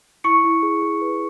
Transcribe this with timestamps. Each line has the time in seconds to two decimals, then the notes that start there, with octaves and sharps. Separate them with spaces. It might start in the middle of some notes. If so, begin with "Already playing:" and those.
0.24 E4 C#6 C#7
0.44 E4
0.63 G#4
0.82 G#4
1.01 B4